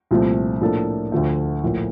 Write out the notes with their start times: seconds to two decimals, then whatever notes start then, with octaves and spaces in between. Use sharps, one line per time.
0.11 C2 A#2 F3 A3 C4
0.61 A2 F3 A#3 D4 A4
1.12 D2 D3 F3 A3
1.63 A#1 A2 F3 A#3